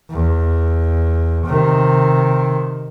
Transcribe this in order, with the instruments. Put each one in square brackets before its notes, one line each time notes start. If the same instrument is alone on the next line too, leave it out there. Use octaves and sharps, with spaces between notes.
[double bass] E2
C3 D#3